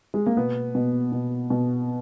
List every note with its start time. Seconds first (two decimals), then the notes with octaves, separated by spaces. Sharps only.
0.14 G#3
0.26 A#3
0.37 B2 B3
0.75 B2
1.12 B2
1.50 B2